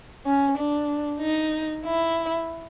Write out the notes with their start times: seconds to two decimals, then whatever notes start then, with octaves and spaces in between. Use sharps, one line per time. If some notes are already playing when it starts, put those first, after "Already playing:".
0.26 C#4
0.57 D4
1.20 D#4
1.85 E4